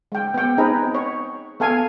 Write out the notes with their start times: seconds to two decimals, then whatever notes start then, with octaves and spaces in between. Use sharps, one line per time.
0.12 G#3 G5
0.34 B3 G5
0.58 C4 D#4 G#4 B4 A#5
0.95 C#5
1.60 B3 A4 F5 G#5